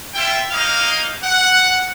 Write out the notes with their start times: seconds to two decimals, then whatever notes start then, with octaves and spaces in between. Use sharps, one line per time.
0.14 E4 F4 E5 G5
0.51 A#3 D#4 D#5 F5
1.23 F#5